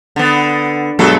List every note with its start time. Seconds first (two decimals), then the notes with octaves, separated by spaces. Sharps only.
0.16 D3 B3
0.99 G2 B2 F#3 G#3 A3 A4